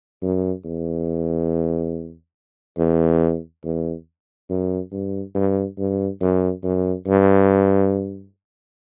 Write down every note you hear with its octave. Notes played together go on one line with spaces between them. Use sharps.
F#2
E2
E2
E2
F#2
G2
G2
G2
F#2
F#2
G2